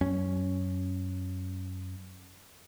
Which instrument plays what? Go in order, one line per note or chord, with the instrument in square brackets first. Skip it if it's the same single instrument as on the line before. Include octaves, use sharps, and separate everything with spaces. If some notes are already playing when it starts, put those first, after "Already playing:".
[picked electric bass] F#2 C#4